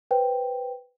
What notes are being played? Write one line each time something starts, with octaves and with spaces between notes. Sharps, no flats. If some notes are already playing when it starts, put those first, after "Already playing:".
B4 C5 G5